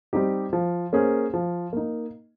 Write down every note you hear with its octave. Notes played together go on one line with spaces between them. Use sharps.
G3 C4 D#4 G4
F3
A#3 C#4 G#4 C5
F3
A#3 D#4